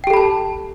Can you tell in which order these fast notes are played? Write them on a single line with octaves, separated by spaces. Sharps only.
G5 G4 A4 B5 A5